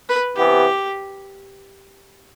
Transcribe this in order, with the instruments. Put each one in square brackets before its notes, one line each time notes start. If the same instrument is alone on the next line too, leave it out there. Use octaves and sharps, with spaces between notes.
[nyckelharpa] B4
[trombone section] C3 E3 B3 [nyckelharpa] G4